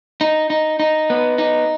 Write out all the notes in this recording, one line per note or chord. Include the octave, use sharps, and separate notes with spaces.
D#4
D#4
D#4
B3
D#4